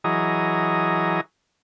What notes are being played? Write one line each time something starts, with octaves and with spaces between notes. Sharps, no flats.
E3 F#3 G#4 D#5 A#5